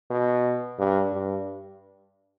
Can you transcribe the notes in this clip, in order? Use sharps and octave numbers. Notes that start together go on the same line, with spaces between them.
B2
G2
G2